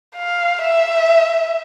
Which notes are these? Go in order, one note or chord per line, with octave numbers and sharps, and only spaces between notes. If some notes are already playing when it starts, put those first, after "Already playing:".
F5
E5